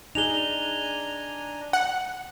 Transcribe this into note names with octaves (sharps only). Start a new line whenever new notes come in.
D4 D#4 G#4 G#5 A#5 F7 G7
F#5